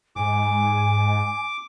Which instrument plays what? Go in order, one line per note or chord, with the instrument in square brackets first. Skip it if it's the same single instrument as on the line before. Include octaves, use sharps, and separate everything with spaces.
[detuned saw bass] G#2 [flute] G#5 [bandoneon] D6